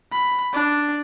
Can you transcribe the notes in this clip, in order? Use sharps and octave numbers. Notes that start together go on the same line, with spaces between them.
B5
D4